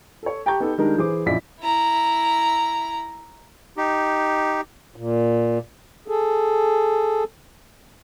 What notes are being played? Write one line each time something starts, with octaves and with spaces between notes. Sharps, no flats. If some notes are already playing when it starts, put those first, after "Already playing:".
A4 C#5
G4 G5 A5 A#5 C#6 G6
B3 D#4 G4 A4
D#3 G3 G#3 D4 A#4
E3 G#4 C5 D6
A#1 F#2 E4 D5 D#5 B6
E4 A#5
D#4 G4
A#2
G#4 A4